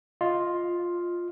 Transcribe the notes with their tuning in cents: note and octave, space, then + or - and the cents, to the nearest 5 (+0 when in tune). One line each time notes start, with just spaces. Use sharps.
F4 +5 D#5 +0